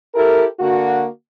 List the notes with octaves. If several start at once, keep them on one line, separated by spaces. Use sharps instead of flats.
E4 G4 A4 A#4
D3 A#3 F#4